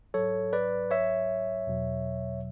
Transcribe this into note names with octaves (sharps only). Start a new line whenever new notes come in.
G#2 F#3 A4 C#5
B4 D5
C#5 E5
E2 B2 F#3